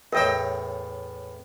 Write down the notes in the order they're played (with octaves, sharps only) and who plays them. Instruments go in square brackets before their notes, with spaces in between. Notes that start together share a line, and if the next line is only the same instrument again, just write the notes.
[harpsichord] E2 A2 C#5 [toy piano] A#4 [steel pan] D#5 G5 E6